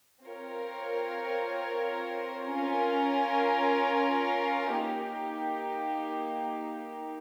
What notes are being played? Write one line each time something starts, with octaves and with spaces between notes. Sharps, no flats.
C4 F4 A#4 C#5
C#4 F4 A#4
A#3 D#4 G4